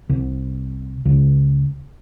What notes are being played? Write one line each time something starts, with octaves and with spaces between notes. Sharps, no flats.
C2
C#2